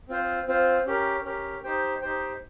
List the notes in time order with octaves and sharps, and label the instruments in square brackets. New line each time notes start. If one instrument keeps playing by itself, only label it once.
[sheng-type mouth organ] C4 F4 C5
C4 F4 C5
C#4 G4 A#4
C#4 G4 A#4
D#4 G4 C5 G5
D#4 G4 C5 G5